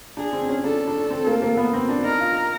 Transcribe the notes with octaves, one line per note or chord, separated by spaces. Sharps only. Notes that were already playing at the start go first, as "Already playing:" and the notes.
D4 G#4
C4
C#4
D4 A4
D4
C4
A#3
A#3
B3
C4
D4
D#4 A#4
F4